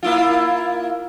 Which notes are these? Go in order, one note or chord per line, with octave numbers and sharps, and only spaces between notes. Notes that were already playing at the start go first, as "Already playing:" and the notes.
A#3 E4 F4